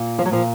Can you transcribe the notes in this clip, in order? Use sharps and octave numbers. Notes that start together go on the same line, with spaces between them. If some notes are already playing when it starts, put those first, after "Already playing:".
Already playing: A#2
F3
F#3
A#2 F3